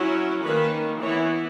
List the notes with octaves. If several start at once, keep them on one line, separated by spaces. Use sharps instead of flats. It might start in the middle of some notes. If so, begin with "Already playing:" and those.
Already playing: F#3 C#4 E4
D#3 A#3 C#4 B4
E3 B3 E4 C#5